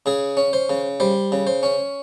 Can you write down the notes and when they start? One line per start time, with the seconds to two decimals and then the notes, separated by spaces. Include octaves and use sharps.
0.06 C#3 G#4
0.37 C#4
0.53 C5
0.70 C#3
1.00 G3 C5
1.32 C#3
1.47 C5
1.63 C#4